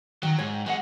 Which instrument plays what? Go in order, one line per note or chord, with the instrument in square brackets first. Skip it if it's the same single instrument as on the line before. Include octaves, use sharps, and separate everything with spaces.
[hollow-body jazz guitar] D#3 [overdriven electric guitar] F#3
[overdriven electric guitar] G#2 [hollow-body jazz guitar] C#5
[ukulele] G5
[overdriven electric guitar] F#3 G#3 [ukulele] F#4 D#5 F#5